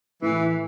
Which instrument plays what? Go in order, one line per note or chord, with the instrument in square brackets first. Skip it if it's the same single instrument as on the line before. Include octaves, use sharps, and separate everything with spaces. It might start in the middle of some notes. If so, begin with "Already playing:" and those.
[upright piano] A2 [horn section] E3